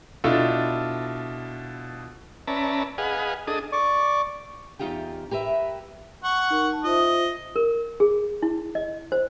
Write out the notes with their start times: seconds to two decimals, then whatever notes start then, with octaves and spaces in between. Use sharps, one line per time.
0.24 B2 D4 E4 F4 A4
2.48 C#4 B4 D5 E5 A5 A#5
2.98 G#4 B4 D#5 F5 F#5 G#5
3.47 D4 G#4 A4 D#5 D#6
3.72 D5 C#6 D6
4.79 E2 G2 D#4 F4 G4 G5
5.31 G4 A#4 B4 E5
6.24 F#5 C#6
6.50 D#4 A#4
6.73 A5
6.84 F4 C5 D#5 E5
7.56 A#4
8.00 G#4
8.42 E4
8.75 D#5
9.12 C5